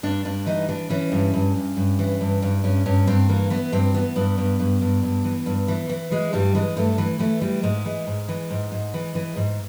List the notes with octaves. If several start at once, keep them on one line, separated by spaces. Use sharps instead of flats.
G2 D4
G2 D4
E3 D#4
E3 D4
E3 C#4
G2
G2
G2
G2
E3
G2
G2
G2 C#4
G2 C#4
G2 C4
E3 A#3
E3 B3
G2 C4
E3 B3
G2 B3
G2
G2
G2
G2
E3
G2
E3
E3
E3 G#3
G2 G3
E3 G#3
G2 A3
E3
E3 A3
E3 G3
G#2 G#3
E3
G#2
E3
G#2
G#2
E3
E3
G#2